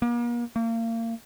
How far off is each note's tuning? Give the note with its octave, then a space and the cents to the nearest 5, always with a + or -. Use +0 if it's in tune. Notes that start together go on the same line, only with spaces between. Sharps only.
A#3 +40
A#3 -30